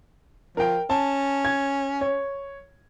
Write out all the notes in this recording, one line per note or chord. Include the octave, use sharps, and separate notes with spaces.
F3 A#4 G5
C#4 A5
G#6
C#5